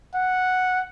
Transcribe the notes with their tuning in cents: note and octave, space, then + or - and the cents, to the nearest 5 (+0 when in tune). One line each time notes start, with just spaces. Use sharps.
F#5 -5